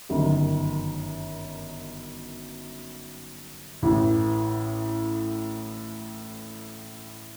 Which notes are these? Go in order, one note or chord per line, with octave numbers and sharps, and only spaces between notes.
G1 F#2 D#3
A1 A2 E3